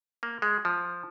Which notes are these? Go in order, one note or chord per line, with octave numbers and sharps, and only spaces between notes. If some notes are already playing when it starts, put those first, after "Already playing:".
A#3
G#3
F3